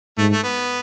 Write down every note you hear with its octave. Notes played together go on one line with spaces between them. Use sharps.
G#2 A3
A3
B3